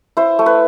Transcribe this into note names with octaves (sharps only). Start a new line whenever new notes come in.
E4 C5
A3
B4